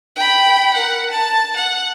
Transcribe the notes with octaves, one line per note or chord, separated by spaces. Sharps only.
G5 B5
A#4 F#5
A5
F#5